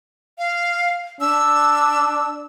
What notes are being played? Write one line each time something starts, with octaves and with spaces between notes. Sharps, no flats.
F5
D4 E6